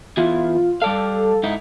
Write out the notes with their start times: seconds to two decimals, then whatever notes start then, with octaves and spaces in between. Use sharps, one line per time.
0.17 E3 B3 E4 F4
0.82 G3 A4 D5 F5
1.43 G#2 D#4 E4